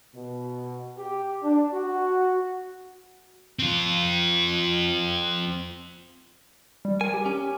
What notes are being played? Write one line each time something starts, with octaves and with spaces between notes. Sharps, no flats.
B2
G4
D4
F#4
C4 F4
G3
A#4 G#5
G4
C#4